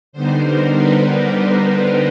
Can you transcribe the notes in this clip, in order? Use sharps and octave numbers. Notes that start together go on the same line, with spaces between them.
D3 G3 B3 D#4 C5
A#4
B4
A#4
B4